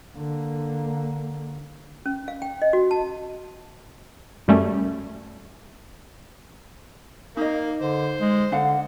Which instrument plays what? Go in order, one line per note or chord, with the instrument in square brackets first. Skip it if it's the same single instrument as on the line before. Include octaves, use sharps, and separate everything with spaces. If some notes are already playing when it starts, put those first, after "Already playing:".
[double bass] D3 A#3
[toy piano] C#4
F5
G5
D#5
F#4
A5
[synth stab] F#2 G3 A3 C#4
[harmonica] A#3 [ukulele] D#4 D#5
[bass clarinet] D3 [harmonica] C5
[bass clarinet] G#3
[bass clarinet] D3 [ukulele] D4 F5 F#5